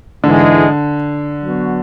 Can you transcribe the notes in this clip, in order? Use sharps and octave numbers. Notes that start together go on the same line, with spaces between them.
G#2 D3 E3 G#3
F#3 B3 F#4